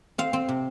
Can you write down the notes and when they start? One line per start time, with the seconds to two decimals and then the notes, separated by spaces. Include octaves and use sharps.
0.18 C4 F5
0.33 C4
0.49 C3